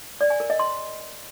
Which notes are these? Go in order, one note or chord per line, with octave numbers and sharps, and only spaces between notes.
D5
G#5
A#4
D#5
C6